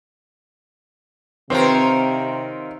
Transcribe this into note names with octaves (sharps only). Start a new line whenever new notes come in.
C3 D#3 C4 F4 A#4 C5 C#5